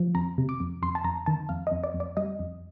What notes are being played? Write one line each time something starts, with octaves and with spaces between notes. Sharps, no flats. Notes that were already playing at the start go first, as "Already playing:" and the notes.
Already playing: F3
F2 A#5
C3
D6
F2
F2 C6
A5
F2 A#5
D#3 A5
F2 F5
D#5
F2
D5
F2
D5
G3 D#5
F2